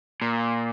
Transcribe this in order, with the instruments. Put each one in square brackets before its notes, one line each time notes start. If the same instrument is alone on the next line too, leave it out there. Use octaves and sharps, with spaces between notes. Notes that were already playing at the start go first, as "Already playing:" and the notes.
[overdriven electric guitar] A#2